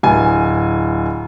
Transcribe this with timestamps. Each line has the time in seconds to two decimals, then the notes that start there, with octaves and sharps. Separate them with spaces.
0.03 D1 G#5